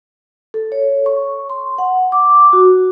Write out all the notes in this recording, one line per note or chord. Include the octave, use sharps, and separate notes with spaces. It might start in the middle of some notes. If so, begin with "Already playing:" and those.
A4
C#5
C#6
C6
F#5
D6
F#4